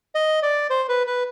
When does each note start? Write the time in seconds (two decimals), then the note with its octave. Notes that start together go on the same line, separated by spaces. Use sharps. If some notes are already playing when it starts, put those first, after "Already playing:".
0.15 D#5
0.43 D5
0.70 C5
0.89 B4
1.07 B4